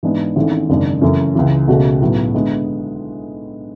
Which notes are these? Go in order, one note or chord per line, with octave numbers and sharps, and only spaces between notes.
G#2 E3 G#3 B3 D4
G#1 G#2 E3 A3 C#4
G#1 F#2 C#3 G#3 D4
F#2 C#3 E3 A3 C#4
C#2 C#3 E3
C#2 B2 A3 C#4 F#4
B1 A2 F#3 B3
D3 G#3 B3 E4